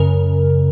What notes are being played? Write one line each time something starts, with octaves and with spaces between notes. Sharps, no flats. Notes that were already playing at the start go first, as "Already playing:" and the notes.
Already playing: F#2 C#3 A#4